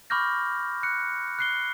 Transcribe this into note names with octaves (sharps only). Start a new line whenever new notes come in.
B5 C#6 D6 F6 G6 A#6
F#6 C#7
F#6 C7 G7